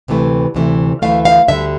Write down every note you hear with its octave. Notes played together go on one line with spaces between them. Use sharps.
D2 C3 E3 A3
D2 C3 E3 A3
D2 C3 E3 A3 F5
F5
D2 D3 G3 E5